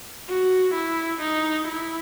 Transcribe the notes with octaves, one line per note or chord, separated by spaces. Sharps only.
F#4
E4
D#4
E4